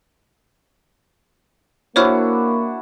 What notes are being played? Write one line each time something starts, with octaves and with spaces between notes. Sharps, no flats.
A#3 D4 E4 F#4 C5 C#5 F6